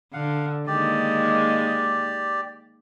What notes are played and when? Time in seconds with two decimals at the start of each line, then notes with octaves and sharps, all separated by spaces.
0.13 D3 F5 F#5
0.67 D#3 G#3 A#3 G4 D5